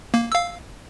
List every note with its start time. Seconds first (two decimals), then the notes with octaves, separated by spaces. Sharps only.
0.14 A#3
0.32 F5 E6